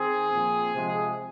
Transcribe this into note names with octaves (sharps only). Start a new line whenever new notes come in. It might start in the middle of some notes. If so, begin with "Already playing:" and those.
Already playing: D#3 C4 G#4
A#2 F3 C4
C3 F3 G#3